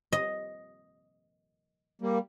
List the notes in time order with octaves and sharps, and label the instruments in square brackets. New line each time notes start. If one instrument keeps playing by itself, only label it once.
[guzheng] D#5
[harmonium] G3 A#3